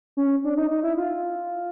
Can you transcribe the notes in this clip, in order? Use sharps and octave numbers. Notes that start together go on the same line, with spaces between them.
C#4
D4
D#4
D#4
E4
F4